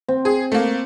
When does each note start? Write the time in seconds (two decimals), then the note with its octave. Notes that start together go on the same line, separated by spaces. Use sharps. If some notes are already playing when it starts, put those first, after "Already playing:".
0.09 C4
0.25 G#4
0.52 A3 A#3